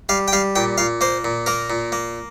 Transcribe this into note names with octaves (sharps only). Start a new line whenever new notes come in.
G3 F5
G5
G3 F5
A#2 G5
A#2 F5
A#3 C5
A#2
A#3 A#4
A#2
A#3